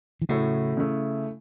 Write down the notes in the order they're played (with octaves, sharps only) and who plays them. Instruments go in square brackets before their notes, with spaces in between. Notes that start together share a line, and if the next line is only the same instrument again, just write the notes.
[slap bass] E3
[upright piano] A2 F#3 A3 E4 [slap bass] C#3
[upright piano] C#3 A3 E4